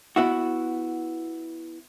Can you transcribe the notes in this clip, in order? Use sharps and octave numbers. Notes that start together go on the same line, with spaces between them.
B3 E4 F#4